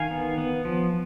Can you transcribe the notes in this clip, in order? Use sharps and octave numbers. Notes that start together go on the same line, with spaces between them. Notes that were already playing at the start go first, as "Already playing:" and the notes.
Already playing: D#3 F5 G#5
B3
B3
F3